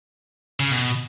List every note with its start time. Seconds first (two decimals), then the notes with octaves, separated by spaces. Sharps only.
0.60 C#3
0.71 B2